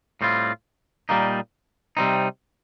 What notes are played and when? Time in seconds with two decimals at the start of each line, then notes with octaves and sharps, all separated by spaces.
0.21 A2 G3 C4 F4
1.09 A#2 G3 A#3 D#4
1.97 C3 G3 C4 D#4